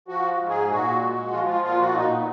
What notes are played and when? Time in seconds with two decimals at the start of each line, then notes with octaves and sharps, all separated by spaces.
0.08 F3 F#4
0.38 G#2
0.49 G#4
0.69 A#2 F#4
1.01 G#3
1.32 F3 F4
1.47 F4
1.63 A#2 F4
1.79 F#4
1.95 A#2 D#4
2.10 B3